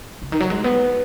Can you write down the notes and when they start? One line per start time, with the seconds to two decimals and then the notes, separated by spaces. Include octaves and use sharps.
0.22 C#3
0.32 D#3
0.40 F#3
0.50 G#3
0.64 B3